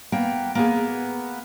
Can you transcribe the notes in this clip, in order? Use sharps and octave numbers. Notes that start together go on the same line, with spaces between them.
A#3 B3 G5
A#3 B3 G#4